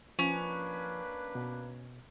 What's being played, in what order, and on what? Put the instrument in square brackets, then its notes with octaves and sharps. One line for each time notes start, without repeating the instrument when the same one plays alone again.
[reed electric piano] F3 [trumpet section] A#3 D4 B4 [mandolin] C#4
[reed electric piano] B2